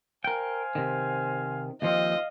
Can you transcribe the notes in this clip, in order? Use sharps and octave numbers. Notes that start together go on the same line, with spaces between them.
A#4 C5 F5 G5 G#5
C3 D#3
D#2 F3 C4 D#5 F5